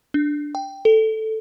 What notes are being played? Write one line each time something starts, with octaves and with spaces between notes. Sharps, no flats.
D4
G5
A4